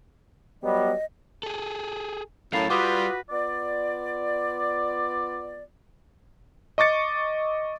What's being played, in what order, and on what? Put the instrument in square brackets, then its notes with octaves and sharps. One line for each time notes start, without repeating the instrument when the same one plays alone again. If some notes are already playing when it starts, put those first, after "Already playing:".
[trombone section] F#3 G3 B3 [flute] D#5
[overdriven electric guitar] G#4 A4
[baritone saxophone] A2 [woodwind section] F#3 A5 [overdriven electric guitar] C#4 A#4 [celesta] F5 C7 F7
[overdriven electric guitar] G3 [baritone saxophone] F4 [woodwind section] F#4 B4 [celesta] D6 D#6
[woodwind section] B3 F4 D5
[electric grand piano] D#5 C#6 D6 A6 C#7